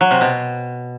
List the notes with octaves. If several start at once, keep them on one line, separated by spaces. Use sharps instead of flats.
F#3
C3
B2